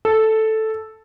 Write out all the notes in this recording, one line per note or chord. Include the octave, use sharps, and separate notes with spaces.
A4